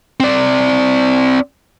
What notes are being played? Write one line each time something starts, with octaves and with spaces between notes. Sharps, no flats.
C4 D5